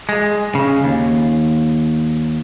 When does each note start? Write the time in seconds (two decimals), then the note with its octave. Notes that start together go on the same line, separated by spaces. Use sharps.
0.09 G#3
0.55 C#3
0.84 D#2